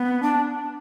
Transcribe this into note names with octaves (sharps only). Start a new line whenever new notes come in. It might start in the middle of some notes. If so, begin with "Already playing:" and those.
Already playing: B3
D4